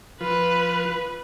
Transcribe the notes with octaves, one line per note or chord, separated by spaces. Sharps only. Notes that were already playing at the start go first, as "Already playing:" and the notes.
F3 F4 B4